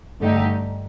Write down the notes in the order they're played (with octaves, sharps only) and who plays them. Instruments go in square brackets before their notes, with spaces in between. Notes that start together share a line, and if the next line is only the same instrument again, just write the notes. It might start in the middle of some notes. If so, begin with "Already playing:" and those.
[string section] G2 D3 A3 D#4 G4